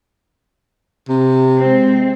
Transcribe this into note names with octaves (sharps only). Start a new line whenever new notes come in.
C3
G#3 C4